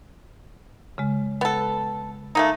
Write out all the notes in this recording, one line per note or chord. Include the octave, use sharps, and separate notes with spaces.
C#3 G#3
B3 A4
A3 A#3 D#4